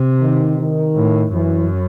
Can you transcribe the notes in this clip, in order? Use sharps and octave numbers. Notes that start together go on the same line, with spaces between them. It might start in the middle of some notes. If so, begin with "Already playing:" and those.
Already playing: C3
D#3
D#3
A2
F#2 E3